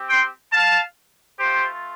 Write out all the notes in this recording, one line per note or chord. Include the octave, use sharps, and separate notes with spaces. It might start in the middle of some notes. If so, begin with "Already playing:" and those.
Already playing: C4 G4
G5 C6
F5 A5
A3 F4 G4 C5